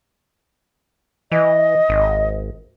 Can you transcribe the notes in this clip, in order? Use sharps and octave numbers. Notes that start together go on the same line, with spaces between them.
E3 D#5
G#1